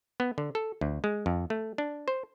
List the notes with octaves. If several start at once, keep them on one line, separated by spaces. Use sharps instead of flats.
B3
D3
A4
D2
G#3
F2
A3
D4
C5